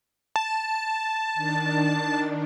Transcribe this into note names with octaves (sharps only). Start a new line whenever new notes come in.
A5
D#3 D4